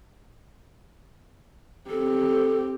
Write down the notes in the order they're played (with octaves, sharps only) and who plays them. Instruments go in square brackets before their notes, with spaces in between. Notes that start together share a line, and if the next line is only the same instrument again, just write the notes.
[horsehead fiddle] C4 G4 [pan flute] A4